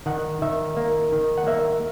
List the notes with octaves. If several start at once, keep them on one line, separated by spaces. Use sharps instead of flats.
D#3 F#5
D#3 E5
A#3
D#3
F#5
A#3 E5